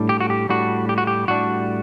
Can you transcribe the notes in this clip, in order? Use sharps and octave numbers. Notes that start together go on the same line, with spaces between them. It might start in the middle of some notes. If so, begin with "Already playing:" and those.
Already playing: A2 G3 D4
G4
F#4
G4
A2 G3 D4 F#4
G4
F#4
G4
A2 G3 D4 F#4